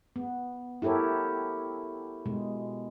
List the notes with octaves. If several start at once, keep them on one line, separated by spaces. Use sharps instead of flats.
B3
E4 G4 A4 A#4 C#5
B2 G#3